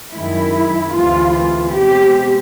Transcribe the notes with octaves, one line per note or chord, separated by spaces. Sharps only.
F#2 D#3 G#3 E4
D2 C3 E3 G#3 F4
F4
B2 G#3 C4 G4